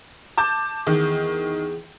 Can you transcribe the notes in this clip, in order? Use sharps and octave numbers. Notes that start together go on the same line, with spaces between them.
A5 D6 G6
E2 D#3